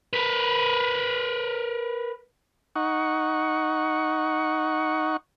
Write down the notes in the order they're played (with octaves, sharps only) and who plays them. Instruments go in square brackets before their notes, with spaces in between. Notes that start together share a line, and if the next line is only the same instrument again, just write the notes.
[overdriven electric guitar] A#4 B4
[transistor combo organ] D#4 F#5 C#6